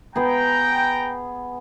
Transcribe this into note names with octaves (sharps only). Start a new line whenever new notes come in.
B3 G#4 G5 A#5